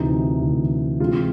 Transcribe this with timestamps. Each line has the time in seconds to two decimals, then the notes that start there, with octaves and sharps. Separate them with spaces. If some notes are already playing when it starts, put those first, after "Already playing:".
Already playing: D2 C3 E3 D#4
0.40 D2 C3 E3
1.00 C3 E3 G#3 C4 F4